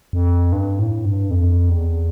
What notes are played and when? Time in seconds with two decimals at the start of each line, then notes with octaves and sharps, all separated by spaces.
0.13 F2
0.52 G2
0.79 A2
1.05 G2
1.30 F2
1.70 E2